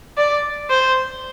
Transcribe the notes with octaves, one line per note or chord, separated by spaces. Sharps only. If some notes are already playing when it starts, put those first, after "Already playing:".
D5
C5